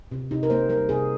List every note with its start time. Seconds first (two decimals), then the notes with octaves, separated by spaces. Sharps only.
0.11 C3
0.31 C3 D#4
0.43 A#4
0.50 A#3 C5
0.69 G3 A#4
0.89 C3 G#4